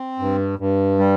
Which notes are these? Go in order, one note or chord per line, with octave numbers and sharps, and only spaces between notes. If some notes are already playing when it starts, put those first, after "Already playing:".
Already playing: C4
G2
G2
G3